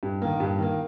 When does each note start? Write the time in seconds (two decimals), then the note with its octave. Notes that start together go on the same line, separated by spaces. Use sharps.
0.03 G2
0.22 D#3 A#3
0.40 G2
0.59 D#3 A#3